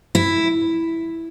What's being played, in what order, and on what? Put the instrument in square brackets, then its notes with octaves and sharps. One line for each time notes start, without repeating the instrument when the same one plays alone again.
[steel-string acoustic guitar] E4